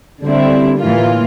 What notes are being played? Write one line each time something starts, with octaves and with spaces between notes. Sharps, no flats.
D3 G3 C4 E4
A2 E3 A#3 F4